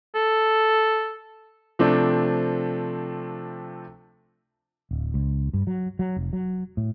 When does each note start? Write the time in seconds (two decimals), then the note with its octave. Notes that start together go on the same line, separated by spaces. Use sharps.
0.15 A4
1.79 C3 F3 A3 C4 D4
4.91 D1
5.14 C#2
5.53 G2
5.67 F#3
5.99 F#3
6.16 F1
6.33 F#3
6.77 A2